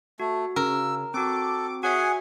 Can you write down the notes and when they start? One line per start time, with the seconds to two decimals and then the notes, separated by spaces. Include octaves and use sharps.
0.20 A3 F#4
0.56 C#3 A#4 E6
1.14 C4 F#4 A4 D6
1.83 F#4 G#4 C#5 E5 F#5 G#5